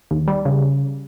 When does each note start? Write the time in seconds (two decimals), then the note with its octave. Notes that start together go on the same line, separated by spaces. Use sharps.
0.11 D#2
0.28 G3
0.45 C#3